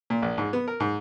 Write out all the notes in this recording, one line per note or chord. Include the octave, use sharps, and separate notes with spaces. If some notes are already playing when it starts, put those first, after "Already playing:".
A#2
A#1
G#2
B3
A#4
G#2